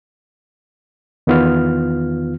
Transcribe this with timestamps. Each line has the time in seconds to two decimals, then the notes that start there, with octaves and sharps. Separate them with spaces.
1.27 E2 D#3 B3 F4 F6